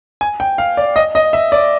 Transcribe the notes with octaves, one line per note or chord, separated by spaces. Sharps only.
G#5
G5
F5
D5
D#5
D#5
E5
D5